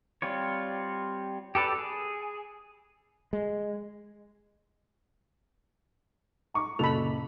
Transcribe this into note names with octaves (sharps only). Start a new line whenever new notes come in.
G3 C4 F4 C#5
G4 A4 B4 D5
G#4
G#3
A#5 C#6 D6
F#1 A#2 A4 B5 F7